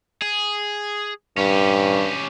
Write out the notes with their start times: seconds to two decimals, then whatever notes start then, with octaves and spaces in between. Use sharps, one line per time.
0.22 G#4
1.37 G2 C#4 G4